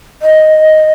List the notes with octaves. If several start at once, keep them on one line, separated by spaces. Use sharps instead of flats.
D#5